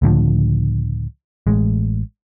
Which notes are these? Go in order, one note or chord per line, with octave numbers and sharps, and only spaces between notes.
C#2 A2 D3 F3
A1 G#3